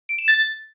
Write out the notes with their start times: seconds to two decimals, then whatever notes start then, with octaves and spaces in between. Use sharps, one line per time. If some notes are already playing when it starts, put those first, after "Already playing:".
0.09 D7
0.18 E7
0.28 A6